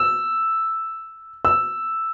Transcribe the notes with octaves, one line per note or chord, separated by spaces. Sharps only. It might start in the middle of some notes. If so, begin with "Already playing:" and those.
Already playing: E6
E6